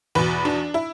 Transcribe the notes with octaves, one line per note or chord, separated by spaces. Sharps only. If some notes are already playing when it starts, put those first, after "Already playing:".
E2 B2 B4
D4
E4